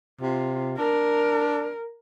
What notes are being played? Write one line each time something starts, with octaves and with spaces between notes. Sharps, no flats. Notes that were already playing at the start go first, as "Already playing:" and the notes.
C3 F4
D4 A#4